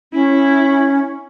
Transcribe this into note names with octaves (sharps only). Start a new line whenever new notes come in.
C#4 E4